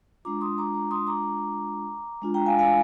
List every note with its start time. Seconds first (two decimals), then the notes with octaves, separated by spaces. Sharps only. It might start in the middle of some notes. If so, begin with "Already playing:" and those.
0.25 G#3 D4 F4 A#5 D6
0.41 C6 D#6
0.58 A#5 D6
0.74 A#5 D6
0.91 C6 D#6
1.07 A#5 D6
2.22 G#3 D4 F4
2.34 G5 A#5
2.46 F5 G#5
2.59 F5 G#5